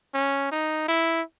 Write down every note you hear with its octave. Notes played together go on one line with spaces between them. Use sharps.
C#4
D#4
E4